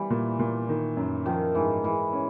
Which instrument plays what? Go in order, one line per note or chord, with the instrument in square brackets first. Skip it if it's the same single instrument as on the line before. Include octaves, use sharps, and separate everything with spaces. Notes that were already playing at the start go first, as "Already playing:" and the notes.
Already playing: [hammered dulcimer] E3 [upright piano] G3
[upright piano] A#2
A#2
D#3
F#2
[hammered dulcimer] D#3 [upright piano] F3
[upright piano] G#2 [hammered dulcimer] E3
[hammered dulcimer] E3 [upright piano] G#3
[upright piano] C#4